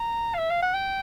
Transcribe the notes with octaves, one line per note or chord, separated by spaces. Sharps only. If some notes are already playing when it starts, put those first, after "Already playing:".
Already playing: A#5
F5
E5
F5
F#5
G5